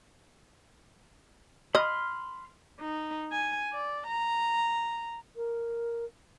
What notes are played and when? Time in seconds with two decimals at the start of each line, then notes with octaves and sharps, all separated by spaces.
1.75 D#5 B5 C6 F6
2.81 D#4
3.32 G#5
3.73 D5
4.07 A#5
5.35 A#4